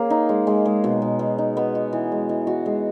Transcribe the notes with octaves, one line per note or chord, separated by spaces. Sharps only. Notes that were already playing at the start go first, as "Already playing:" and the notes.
Already playing: A#3 C#4 G#4
D#4
G#3
G#3
G#3
B2
B2
B2
D#4
B3
F#4
E3
G#3
E3
F#4
G#3